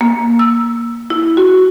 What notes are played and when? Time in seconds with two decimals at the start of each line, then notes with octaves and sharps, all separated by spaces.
0.01 A#3
0.39 E6
1.10 E4
1.37 F#4